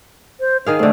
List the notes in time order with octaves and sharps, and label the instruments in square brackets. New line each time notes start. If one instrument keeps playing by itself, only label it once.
[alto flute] C5
[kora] D#3 G#4 F5 [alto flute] A#4
[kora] D3 C4 [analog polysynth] A3